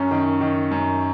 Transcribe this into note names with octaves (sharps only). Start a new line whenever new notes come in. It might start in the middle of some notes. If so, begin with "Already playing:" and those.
Already playing: F#2 C#4
D#3
D#3
F#2